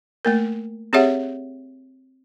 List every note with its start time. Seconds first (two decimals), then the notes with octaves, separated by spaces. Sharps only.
0.25 A3 A#3 A#4
0.93 C4 G4 G#4 C#5 E5 F#5